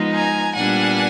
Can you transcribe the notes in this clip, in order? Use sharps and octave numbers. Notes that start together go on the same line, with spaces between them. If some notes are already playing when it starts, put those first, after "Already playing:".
Already playing: F3 G#3 B3 D#4
G#5 A#5
A#2 G3 B3 D4 F#5 G#5